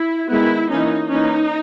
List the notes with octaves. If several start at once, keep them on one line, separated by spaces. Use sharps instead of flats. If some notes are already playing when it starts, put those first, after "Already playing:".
Already playing: E4
D#3 G#3 B3 E4
E3 A#3 C#4 D#4
E3 A#3 C#4 D#4